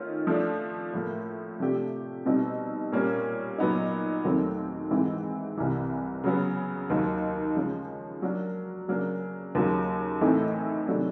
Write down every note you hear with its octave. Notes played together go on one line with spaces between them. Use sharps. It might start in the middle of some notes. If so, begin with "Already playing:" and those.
Already playing: D#3 A3 C#4 F4
F3 A3 D4
A2 F3 A#3
C3 F3 A3 D4 G4
B2 G3 C4 D#4
A#2 G3 A#3 C#4
A#2 F#3 B3 D#4
D#2 D#3 F#3 A3 C4
G#2 E3 G#3 C4
C2 C3 E3
C#3 F#3 B3
D#2 D#3 F#3
C#3 F3 G#3 C#4
F#3 A#3 D4 F#4 A#4
C#3 F#3 A#3 D4
D#2 C#3 F#3
A2 E3 A3 C4 D#4
C3 D#3 F#3 A3 D4